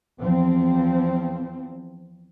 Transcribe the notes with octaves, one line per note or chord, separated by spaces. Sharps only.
E2 F3 C4